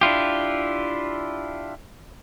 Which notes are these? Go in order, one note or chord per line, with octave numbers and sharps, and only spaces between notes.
D4 E4 F4 G4